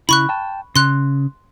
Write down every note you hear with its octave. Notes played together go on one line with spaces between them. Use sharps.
C#3 E4 B5 C#6 F#6
G5 A5
C#3 C6 F#6